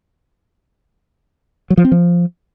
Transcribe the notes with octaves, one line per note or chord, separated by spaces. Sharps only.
F#3
F3
C4
F3